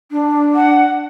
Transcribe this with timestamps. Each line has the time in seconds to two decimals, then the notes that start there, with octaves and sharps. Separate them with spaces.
0.12 D4
0.55 F#5